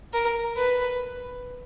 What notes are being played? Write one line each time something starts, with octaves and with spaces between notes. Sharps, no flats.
A#4
B4